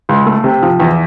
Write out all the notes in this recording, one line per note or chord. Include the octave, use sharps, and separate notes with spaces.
C#2
A3
C3
F3
E2